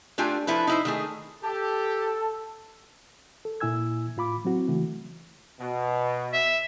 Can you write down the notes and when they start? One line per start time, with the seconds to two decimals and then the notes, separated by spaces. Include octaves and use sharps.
0.18 A3 D4 F4 G4 G5 G#5
0.47 F3 E4 A4 B4
0.67 D#4 E4 C5
0.85 D#3 A3 G#4
1.43 G4 A4 A5
3.45 A4
3.60 A#2 E4 G#5 E6 G#6
4.17 A2 F4 B5 D6
4.45 F#3 C4 E4 F#4
4.68 C#3 E3 A3
5.60 B2
6.33 E5